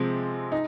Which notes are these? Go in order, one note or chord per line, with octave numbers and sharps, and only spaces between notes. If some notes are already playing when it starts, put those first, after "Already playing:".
Already playing: C3 F3 G#3 C4
D#4